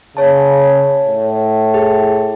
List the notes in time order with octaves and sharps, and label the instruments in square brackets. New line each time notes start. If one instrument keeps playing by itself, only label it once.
[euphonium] C#3 [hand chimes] C#5 A5
[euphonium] A2
[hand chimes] G#4